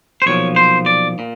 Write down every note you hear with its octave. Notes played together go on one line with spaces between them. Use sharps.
C5
B1 A#2 F3 C#5
C5
D5
A#2